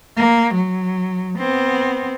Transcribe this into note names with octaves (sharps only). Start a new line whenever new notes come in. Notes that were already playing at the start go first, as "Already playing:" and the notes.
A#3
F#3
B3 C4